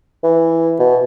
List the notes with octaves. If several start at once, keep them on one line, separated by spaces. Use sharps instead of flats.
E3
B2